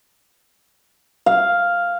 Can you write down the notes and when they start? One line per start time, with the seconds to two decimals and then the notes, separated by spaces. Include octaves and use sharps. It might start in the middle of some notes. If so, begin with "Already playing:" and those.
1.26 F5